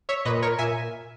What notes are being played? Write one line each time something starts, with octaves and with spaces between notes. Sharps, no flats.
C#5 E5
A#2 B4 D#5
A#4 C#5
A#2 E5 G#5